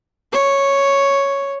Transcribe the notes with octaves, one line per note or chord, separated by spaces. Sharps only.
C#5